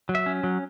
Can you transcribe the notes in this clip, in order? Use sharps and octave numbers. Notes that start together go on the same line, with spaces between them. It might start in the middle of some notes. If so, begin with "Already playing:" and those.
F#3
E5
C#4
F#3